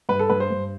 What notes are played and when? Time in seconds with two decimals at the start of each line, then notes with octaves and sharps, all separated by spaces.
0.09 G2 B4
0.19 A4
0.30 G2 B4
0.40 C5
0.51 G2